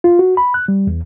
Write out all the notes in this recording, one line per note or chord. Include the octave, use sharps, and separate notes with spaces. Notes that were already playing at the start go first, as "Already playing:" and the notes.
F4
F#4
B5
F#6
G3
E2